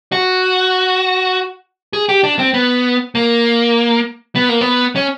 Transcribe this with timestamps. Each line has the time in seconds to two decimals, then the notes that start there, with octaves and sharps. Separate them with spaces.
0.12 F#4
1.93 G#4
2.09 G4
2.24 D4
2.39 C4
2.54 B3
3.15 A#3
4.35 B3
4.49 A#3
4.61 B3
4.96 C#4